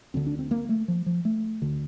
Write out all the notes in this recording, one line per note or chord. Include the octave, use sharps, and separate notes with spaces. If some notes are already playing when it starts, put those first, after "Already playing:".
D2 D3 C4
D4
C4
A#3
A3
F3
F3
A3
D2 D3